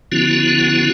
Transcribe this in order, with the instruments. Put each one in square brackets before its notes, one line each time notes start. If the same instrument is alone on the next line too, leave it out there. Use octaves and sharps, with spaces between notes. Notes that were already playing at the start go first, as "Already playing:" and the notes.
[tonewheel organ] D3 F3 B3 C#4 E4 F#4